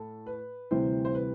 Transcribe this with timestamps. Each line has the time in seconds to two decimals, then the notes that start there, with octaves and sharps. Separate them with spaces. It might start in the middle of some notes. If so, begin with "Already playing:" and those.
Already playing: A2 A4
0.26 B4
0.71 D2 C3 E3 G3 C5
1.05 C5
1.15 B4